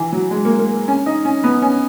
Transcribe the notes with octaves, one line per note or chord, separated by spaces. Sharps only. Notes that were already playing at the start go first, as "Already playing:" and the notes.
Already playing: E3
F#3
G#3
A#3
A#3
C#4
D#4
C#4
B3
C#4